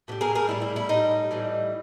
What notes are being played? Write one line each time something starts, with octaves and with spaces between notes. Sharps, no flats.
A2 E3 G3
G#4 A#4
G#4 A#4
A2 E3 G3 E4
E4
E4
A2 E3 G3 D#4
A2 E3 G3